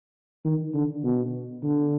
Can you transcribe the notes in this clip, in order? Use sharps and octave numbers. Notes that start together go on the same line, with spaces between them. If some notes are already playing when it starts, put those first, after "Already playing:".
D#3
D3
B2
D3